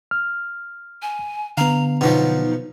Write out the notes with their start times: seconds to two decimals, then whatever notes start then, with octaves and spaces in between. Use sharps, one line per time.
0.11 F6
1.02 G#5
1.57 D3 B3 F5 A#5
2.01 B2 F3 F#3 D#4